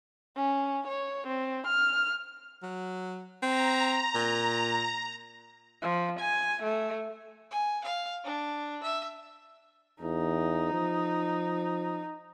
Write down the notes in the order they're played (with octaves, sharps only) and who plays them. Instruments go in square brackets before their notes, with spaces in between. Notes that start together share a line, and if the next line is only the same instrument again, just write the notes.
[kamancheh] C#4
C#5
C4
F6
[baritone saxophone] F#3
[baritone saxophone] C4 [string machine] A#5
[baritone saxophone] A#2
[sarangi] F3
G#5
A3
[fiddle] G#5
F5
D4
E5
[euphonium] E2 [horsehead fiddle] D#4
[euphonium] F3